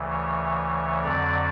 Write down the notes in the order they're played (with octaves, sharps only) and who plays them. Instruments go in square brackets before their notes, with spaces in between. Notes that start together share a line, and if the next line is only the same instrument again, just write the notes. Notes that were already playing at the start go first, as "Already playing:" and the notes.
Already playing: [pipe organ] D2 C#3 E3
C#5
F2 D3 F#3 D5